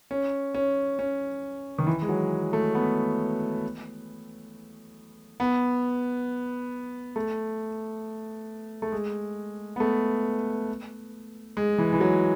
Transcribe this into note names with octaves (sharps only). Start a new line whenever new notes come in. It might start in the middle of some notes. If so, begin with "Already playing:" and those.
C#4
C#4
C#4
D#3
E3
G#3
F#3
A3
B3
B3
A3
A3
G#3
B3
A3
G#3
E3
E3
F#3